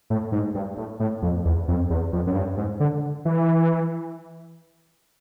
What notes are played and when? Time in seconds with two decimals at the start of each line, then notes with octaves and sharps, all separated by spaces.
0.10 A2
0.32 G#2
0.55 G2
0.77 A2
1.00 A2
1.22 F2
1.45 E2
1.68 F2
1.90 E2
2.13 F2
2.27 F#2
2.35 G2
2.58 G#2
2.80 D3
3.25 E3